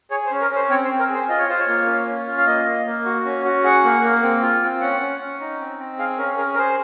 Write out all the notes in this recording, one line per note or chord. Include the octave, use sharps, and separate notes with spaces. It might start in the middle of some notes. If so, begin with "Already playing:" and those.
G#4 C#5
C5
C#4
A#4
C#4 C5
C4 C#5
C5
C4
A#4
G#4
C5
F4 D#5
C#5
F4 C5
C#5
A#3
C#4
C#4
F4
F5
A#3 D#5
A#3
A#3
F#4
C#4
F#4
G#4 F#5
A#3
A#3
C4
F4
C4
C#4 F#5
C#4
C#4
D#4
C4
C4
G#4 F5
C#4 A#4
G#4 A#4
A#4
G#4 C5